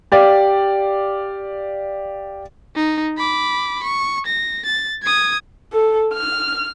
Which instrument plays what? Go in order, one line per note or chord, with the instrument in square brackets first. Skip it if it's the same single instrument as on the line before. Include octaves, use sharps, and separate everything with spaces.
[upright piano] G4 D5 F5
[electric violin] D#4
B5 D6
C#6
A#6
A6
D#6 G#6
[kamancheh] A4
F6